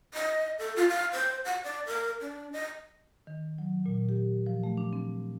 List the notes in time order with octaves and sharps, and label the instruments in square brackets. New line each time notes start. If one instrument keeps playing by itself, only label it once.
[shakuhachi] D#5
A4
F4
F5
C5
F#5
D5
A#4
D4
D#5
[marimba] D#3
F#3
A#2
G4
F3
A3
D4
C4